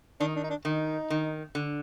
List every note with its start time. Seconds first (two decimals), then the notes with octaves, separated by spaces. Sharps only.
0.20 D#3 D4
0.28 D#4
0.36 D4
0.43 D#4
0.50 D4
0.65 D#3 D#4
1.10 D#3
1.55 D3